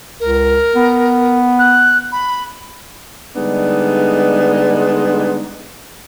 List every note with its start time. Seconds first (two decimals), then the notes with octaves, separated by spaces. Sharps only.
0.20 C#2 A#4
0.75 B3
1.59 F#6
2.12 B5
3.35 D3 G3 G#3 B3 D4 D#4